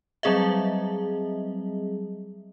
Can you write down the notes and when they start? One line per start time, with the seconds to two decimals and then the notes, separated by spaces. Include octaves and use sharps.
0.23 F#3 G3 C4 G#4 D#5 E5